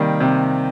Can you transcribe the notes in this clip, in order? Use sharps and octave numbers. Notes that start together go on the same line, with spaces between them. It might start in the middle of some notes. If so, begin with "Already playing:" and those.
Already playing: C3 D#3 G3 A#3
C3